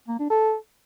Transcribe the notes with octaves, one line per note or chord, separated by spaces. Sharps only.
A#3
D4
A4